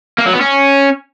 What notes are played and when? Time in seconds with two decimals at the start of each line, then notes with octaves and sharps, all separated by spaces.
0.18 A#3
0.26 F#3
0.33 B3
0.41 C#4